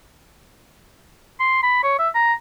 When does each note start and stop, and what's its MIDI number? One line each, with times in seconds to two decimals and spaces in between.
1.40 1.58 84
1.63 1.80 83
1.83 1.94 73
1.99 2.08 76
2.15 2.33 82